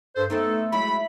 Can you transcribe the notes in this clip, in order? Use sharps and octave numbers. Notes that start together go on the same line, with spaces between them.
G2 A4 C5
A3 B3 C4 D#4 A4
F#3 G#3 E4 B5